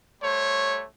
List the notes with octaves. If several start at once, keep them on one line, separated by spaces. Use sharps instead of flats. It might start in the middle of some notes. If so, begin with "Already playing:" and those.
G3 A3 C5 C#5